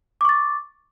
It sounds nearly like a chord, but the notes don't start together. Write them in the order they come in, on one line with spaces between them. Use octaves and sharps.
D6 C#6 A6